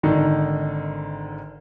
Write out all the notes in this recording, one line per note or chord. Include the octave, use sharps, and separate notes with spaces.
G#1 D3 D#3 D#4